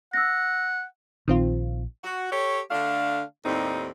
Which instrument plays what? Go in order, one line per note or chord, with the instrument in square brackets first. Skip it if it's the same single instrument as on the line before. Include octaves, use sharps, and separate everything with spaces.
[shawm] F#5 [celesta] E6 A#6
[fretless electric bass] A#1 [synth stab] D#3 C4 F4
[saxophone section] F#4
G4 A4 C#5
D3 A3 D4 F5
D#2 A2 G3 C4 D#4